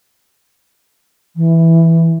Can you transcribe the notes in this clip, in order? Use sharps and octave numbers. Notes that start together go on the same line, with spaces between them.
E3